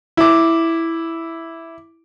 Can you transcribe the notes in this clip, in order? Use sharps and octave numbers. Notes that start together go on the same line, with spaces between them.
E4 D6